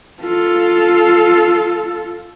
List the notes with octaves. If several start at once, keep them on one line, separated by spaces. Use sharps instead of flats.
F4 A4